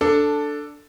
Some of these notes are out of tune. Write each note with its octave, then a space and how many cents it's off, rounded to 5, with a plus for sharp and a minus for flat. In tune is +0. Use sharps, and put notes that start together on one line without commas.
D4 +0 A4 +5